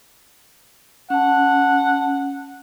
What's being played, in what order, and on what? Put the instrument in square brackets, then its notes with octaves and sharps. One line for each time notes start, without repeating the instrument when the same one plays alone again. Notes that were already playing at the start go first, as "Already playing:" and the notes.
[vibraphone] C#4 A5 [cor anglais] F#5